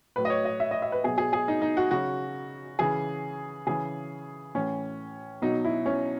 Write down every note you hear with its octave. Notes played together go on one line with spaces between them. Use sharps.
A2 F#3 B4
D#5
C#5
D#5
E5
D#5
E5
B4
B2 F#3 G#4
G#4
G#4
D#4
D#4
F#4
C#3 F#3 F#4
C#3 E3 G#4
C#3 E3 G#4
A2 E3 C#4
B2 F#3 D#4
E4
C#4